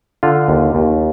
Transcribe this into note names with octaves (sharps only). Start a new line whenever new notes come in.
D3 F4
D#2
D#2